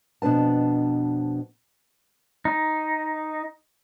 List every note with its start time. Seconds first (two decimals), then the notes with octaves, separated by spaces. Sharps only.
0.22 F2 B2 D4 B4 A5
2.45 D#4